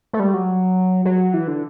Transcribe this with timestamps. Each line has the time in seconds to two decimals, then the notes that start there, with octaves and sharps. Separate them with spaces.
0.13 A3
0.20 G3
0.34 F#3
1.05 F#3
1.34 E3
1.48 D3